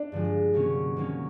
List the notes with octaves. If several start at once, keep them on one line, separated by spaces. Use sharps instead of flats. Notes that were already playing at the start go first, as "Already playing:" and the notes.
Already playing: D4
G2 D3 F3 G#3
C3 D#3 F#3 A#3 C#4
C3 D#3 F#3 A#3 C#4